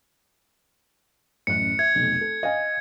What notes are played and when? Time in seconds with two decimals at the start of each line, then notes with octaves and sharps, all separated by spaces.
1.47 A1 F#2 F#6 C#7
1.79 E5 G#6
1.95 F1 B1
2.21 A4
2.43 D#5 F5 G#5